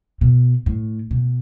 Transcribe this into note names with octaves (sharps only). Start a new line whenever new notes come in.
B2
A2
B2